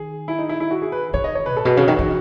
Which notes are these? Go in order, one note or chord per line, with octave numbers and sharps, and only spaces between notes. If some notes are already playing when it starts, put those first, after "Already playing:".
Already playing: D#3 G#4
E4
D#4
E4
E4
F#4
G#4
B4
D#3 C#5
D#5
C#5
B4
A2 A4
B2 G#4
C#3 F#4
D#3 F#4
E3